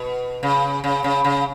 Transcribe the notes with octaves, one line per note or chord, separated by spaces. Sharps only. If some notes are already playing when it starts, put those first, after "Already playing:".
Already playing: B2
C#3
C#3
C#3
C#3